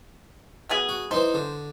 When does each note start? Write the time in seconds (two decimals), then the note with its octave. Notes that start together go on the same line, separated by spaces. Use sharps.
0.69 B2 B3 G#4
0.89 F#4
1.11 E3 D#4 C5
1.34 D3